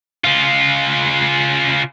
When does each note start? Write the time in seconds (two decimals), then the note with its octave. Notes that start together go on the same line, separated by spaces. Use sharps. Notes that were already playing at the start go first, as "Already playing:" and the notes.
0.24 C#3 F4